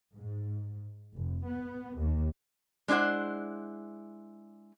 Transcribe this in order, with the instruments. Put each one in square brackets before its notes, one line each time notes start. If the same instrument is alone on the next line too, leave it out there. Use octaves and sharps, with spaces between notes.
[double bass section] G#2
F1
B3
D#2
[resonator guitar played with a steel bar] G#3 D4 E4 C5 F#5